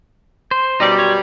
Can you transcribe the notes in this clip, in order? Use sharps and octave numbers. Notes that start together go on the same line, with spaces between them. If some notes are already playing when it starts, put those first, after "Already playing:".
C5
F#2 B2 G3 D#4 D5
C#5